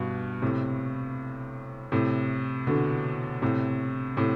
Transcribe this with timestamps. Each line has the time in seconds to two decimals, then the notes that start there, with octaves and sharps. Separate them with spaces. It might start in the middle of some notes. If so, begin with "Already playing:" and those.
Already playing: G2 B2
0.42 A2 C3
1.92 A2 C3
2.67 B2 D3
3.42 A2 C3
4.17 A2 C3